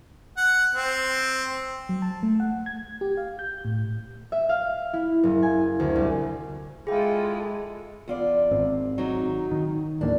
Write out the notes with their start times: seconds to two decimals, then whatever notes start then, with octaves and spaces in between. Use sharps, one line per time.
0.37 F#5
0.74 C4
1.89 F#3
2.02 A5
2.23 A3
2.40 F#5
2.66 G#6
3.01 G4
3.17 F5
3.39 G6
3.65 A2
4.32 E5
4.49 F5
4.93 E4
5.23 F#1
5.43 G#5
5.80 D2
5.96 C2
6.87 G#3 E4 F4 G#4 A4 G5
8.08 E2 F4 D5
8.51 G#1 C4
8.98 F#3 D#4
9.51 D#3
10.01 D1 E2 A#3 D4